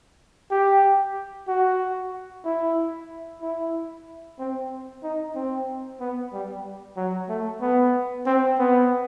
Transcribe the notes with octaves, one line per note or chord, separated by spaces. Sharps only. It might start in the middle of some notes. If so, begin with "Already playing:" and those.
G4
F#4
E4
E4
C4
D#4
C4
B3
G3
F#3
A3
B3
C4
B3